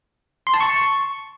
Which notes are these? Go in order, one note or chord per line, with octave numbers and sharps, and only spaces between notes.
C6
A5
C#6